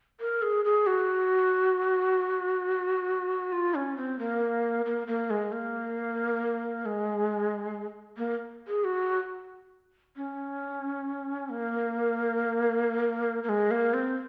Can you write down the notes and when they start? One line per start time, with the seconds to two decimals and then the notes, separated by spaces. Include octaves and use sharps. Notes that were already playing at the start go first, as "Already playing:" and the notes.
0.20 A#4
0.42 G#4
0.65 G#4
0.87 F#4
3.52 F4
3.75 C#4
3.97 C4
4.19 A#3
4.85 A#3
5.07 A#3
5.30 G#3
5.52 A#3
6.86 G#3
8.17 A#3
8.68 G#4
8.84 F#4
10.16 C#4
11.50 A#3
13.44 A#3
13.49 G#3
13.71 A#3
13.94 C4